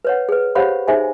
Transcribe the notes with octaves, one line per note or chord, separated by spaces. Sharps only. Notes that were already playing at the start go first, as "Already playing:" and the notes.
B4 C#5 F#5
G#4 B4
G4 C5 C#5 F5 F#5 B5
D#4 G#4 C5 E5 G#5